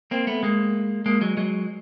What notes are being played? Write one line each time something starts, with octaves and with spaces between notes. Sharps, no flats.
A#3 C4
A3 B3
G#3 A#3
G#3 A#3
F#3 G#3
F#3 G#3